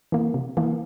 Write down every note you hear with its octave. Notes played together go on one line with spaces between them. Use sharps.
E3 A#3
C3
E3 A#3